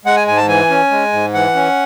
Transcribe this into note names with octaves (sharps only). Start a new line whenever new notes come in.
G#3 F#5
G#5
G#2 G#5
A5
E3 G#5
C#4
G#3
G#2
E3 F#5
C#4